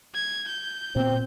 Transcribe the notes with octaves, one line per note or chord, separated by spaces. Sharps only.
G#6
G6
A#2 B3 C4